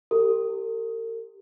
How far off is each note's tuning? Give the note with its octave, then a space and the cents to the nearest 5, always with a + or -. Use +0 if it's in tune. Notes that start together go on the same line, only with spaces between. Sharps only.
G4 +0 A#4 -40